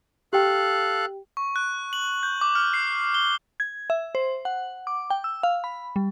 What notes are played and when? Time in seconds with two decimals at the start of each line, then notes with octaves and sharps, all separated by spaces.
0.33 G4 A4 F5 G5 F#6
1.37 C#6
1.56 F#6
1.93 F#7
2.23 G6
2.41 D6
2.55 F6
2.74 C7
3.14 G7
3.60 G#6
3.90 E5
4.15 C5
4.45 F#5
4.87 D6
5.10 G5
5.24 E6
5.43 F5
5.64 B5
5.96 G3